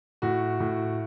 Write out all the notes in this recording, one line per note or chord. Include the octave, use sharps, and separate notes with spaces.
A2 F#4
A2